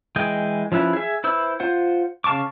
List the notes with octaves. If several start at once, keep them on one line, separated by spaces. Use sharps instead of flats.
E3 G#3 D#5 G5
F3 C#4 E4 B4
G#4 E5
E4 B4 C5 E6
F4 C5 F#5
C#3 F5 A5 C#6 D6